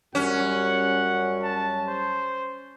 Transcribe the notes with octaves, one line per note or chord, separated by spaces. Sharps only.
F#2 G3 C#4 F#5
A5
C5